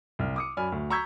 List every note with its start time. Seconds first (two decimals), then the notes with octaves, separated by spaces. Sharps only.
0.19 C2 F6
0.36 D6 D#6 C#7
0.57 F#2 D5 G#5 B5 F6
0.72 D2
0.90 A#5 C#6 E6 G6 G#6 B6